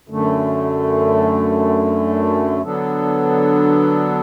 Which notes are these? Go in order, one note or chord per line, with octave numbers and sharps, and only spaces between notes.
F#2 D3 A3
D3 F#3 B3 D4 A4